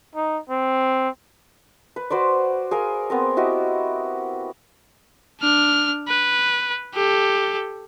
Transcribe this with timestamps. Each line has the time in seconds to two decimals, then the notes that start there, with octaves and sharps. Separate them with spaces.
0.15 D#4
0.50 C4
1.96 B4
2.10 F#4 B4 C5 D5
2.71 G#4 A#4 F5
3.10 B3 C4 A#4
3.37 E4 F#4 G4 D#5
5.41 D4 F6
6.08 B4
6.95 G4 A4